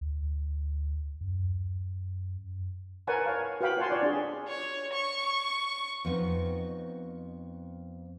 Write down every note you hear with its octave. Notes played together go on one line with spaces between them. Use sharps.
D2
F#2
A#4 B4 C#5 F#5 G#5 A5
C#5 F5
F#4 B4 F5 G5 B5
F4 C#5 F#5 G#5 A5 C6
C#5 D5
D4 G#4
C#5
C#6
F2 B3 C#4 D#4